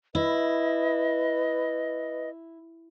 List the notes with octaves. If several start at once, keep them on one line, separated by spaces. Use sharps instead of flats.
E4 B4 D#5